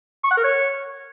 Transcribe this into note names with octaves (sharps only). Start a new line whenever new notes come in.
C#6
F#5
A#4
C#5